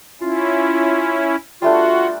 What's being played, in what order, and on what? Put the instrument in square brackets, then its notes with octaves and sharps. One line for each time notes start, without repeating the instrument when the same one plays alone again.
[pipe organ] C#4 E4 [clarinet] F4
[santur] G3 A3 D4 [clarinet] F4 [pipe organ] F#4